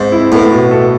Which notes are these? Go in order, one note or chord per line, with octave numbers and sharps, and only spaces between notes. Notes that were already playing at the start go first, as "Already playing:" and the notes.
Already playing: G#2 C4
E4
A2 B3
B2
A4